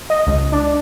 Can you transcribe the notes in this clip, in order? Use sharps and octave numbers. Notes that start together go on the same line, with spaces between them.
D#5
C#2
D4